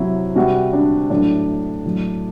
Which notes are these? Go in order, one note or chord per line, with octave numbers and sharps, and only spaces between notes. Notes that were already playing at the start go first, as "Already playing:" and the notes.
Already playing: C3 F#3 E4
C3 G3 F#4
D4
A2 F#3 D4
A2 F#3